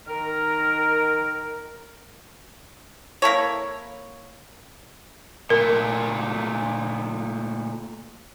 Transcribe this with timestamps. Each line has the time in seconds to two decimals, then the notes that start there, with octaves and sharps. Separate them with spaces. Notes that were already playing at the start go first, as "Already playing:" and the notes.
0.08 D#3 A#4
3.22 A#3 E4 A4 C#5
5.50 A#2 A3 A#4